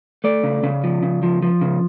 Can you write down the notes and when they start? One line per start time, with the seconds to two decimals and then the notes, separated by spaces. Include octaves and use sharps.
0.24 A3 D5
0.43 C#3
0.63 C#3
0.84 F3
1.03 C#3
1.23 F3
1.42 F3
1.61 C#3